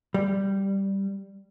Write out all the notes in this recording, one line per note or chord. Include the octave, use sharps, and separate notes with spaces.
G3